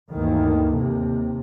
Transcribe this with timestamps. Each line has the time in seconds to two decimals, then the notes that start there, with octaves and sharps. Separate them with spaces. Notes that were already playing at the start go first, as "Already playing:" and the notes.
0.11 D2 G2 D#3 E3 A3 A#3
0.77 D#2 C3